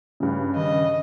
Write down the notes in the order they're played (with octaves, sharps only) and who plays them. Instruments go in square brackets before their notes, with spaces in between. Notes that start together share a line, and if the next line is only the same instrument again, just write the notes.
[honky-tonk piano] G2 C#3
[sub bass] D#3 [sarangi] D#5